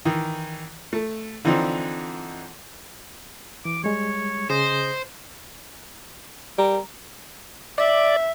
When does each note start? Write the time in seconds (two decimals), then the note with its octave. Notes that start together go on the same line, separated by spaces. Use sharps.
0.05 D#3 E3
0.93 A3
1.45 D3 E3 F3 C4 D#4
3.65 E3 D6
3.84 G3 G#3 C#5
4.50 C#3 G#4 C5 D#5
6.58 G3 A#4
7.78 D5 E5